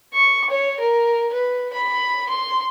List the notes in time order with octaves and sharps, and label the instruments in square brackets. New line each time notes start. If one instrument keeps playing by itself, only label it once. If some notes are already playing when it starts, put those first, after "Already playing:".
[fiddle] C#6
C#5
A#4
B4
B5
C6